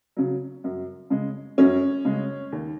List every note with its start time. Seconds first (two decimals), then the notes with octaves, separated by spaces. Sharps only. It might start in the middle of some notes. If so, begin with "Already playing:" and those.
0.17 C#3 F#3
0.64 F#2
1.10 C#3 G#3
1.58 F#2 C#4
2.05 C#3 G#3
2.52 D#2